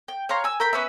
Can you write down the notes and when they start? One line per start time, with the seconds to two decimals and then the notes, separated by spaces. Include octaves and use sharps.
0.08 G5
0.29 C#5 F5 A#5 C6
0.44 G#5 E6
0.60 A#4 G5 B5
0.73 B3 C#4 B4 E5